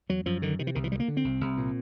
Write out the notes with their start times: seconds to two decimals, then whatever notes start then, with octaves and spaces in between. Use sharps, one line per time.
0.09 E2 F#3
0.26 F#2 F3
0.42 D3 D#3
0.59 C3 D#3
0.67 E3
0.75 C2 D#3
0.84 E3
0.91 D2 G3
1.00 A#3
1.08 D3
1.17 C4
1.24 C2
1.41 C2
1.57 A#2